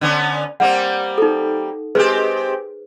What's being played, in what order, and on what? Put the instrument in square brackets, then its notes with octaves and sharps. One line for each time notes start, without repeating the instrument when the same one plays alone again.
[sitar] D3 B3 C#4
[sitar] G3 A#3 C4 [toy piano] F#5
[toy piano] D#4 A4
[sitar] G#3 C4 G4 [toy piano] G#4 B4 C5